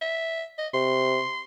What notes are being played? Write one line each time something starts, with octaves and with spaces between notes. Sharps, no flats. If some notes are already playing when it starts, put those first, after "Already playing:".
E5
D#5
C3 C6